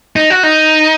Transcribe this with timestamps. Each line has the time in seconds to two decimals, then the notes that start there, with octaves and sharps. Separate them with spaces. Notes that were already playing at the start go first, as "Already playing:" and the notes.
0.16 D#4
0.30 F#4
0.43 D#4